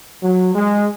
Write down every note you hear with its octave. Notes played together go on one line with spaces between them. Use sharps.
F#3
G#3